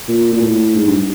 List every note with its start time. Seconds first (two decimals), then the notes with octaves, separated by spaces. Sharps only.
0.08 A#2
0.33 A#2
0.42 A2
0.76 G#2
0.87 G2